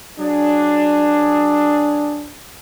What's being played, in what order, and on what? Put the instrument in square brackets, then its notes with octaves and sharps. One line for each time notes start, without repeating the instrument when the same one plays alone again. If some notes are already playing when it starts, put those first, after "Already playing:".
[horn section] F#3 D4 G#4